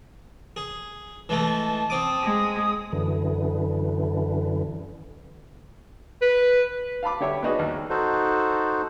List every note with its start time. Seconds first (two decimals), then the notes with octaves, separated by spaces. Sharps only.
0.56 G#4
1.29 E3 G#3 A3 A5
1.90 C4 D6 D#6
2.23 G#3
2.92 F#2 D3 E3
6.22 B4
7.03 F5 A5 B5 D6
7.20 D3 G4 C#5 E5 D6
7.42 B3 D4 D#4 F#4 G#4 B4
7.59 D#2
7.90 D#4 F#4 A4 C5